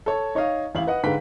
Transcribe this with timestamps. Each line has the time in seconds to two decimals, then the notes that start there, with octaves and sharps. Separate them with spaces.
0.06 A4 C#5
0.35 D#4 C#5 D#5 F5
0.75 A1 E4 F5 F#7
0.87 B4 D#5 F#5
1.03 G#2 D3 B4 F5 G5 B6